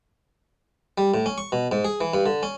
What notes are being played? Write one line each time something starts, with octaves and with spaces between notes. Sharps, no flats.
G3
A2
C#4
C#6
B2
G#2
G#4
E3
G2
D3
C#4